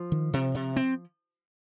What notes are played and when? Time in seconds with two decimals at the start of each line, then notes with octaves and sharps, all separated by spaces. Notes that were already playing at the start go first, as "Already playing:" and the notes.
Already playing: F3
0.12 D#3
0.33 C3
0.55 C3
0.76 C4